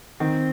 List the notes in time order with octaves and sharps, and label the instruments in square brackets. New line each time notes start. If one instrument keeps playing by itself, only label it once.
[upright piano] D#3 [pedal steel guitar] C4